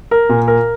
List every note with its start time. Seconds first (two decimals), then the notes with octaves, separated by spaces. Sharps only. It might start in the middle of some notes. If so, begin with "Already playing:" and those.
0.11 A#4
0.29 A#2
0.48 A#4